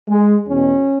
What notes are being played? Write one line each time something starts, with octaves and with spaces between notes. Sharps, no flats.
G#3
E2 B2 C#4